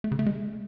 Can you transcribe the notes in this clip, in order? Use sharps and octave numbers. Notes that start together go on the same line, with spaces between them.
A3
C#3
A3
G#3